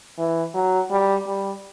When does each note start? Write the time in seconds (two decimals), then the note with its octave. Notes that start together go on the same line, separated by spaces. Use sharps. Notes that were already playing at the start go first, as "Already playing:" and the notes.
0.18 E3
0.54 F#3
0.91 G3
1.26 G3